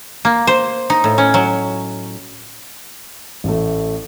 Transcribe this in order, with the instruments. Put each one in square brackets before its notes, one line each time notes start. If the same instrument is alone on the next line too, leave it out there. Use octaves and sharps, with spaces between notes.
[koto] A#3
C5
D#4
A2
C#4
F#3
[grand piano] A1 A3